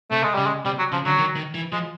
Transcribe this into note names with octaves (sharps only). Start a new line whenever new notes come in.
C3 A3
G#3
C#3 G3
G#3
C3 G3
F#3
C#3 F3
D3 F#3
D#3
D#3
E3
F3 G#3